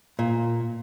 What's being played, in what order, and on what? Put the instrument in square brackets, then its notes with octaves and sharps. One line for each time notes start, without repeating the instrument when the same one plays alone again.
[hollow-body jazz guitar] A#2